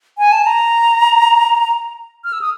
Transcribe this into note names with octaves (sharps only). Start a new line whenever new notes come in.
G#5
A5
A#5
F6
E6
D#6